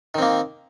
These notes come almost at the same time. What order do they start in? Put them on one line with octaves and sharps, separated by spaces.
D#3 C4 A#3